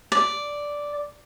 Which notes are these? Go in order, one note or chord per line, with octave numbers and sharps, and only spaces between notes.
D5